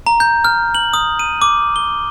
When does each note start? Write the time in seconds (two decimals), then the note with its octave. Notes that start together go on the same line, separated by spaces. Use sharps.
0.07 A#5
0.20 G6
0.45 F6
0.75 F#7
0.94 D#6
1.19 D#7
1.42 D6
1.76 G7